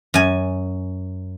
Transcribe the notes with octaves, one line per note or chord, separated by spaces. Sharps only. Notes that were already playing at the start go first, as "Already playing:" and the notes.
F#2 G#5